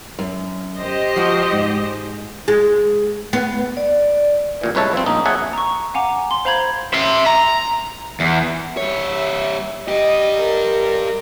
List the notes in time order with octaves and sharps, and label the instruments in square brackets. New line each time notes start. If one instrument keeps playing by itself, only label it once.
[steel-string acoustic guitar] F#2
[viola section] G4 C5 D#5
[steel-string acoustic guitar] F3 F#4
G#2
[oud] G#3
B3
[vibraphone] D5
[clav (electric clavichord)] A1 A#2 E3
C2 G#3 B4 C#5 E5 A5
F3 C4
A#1 A#3 D#4
G#4 C#5 E5 F#5 G#5 A5
[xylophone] A#5 C#6
F5 F#5 G#5 A#5 D6
C6
C5 F5 A#5 B5 G6 G#6
[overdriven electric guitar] E5 C6
A#5
E2
[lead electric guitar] G3 C#5 [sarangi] E5
[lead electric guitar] G2 G4 [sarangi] D#5
[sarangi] A#4